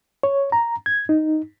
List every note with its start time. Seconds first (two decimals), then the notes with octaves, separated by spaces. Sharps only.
0.23 C#5
0.52 A#5
0.86 G#6
1.09 D#4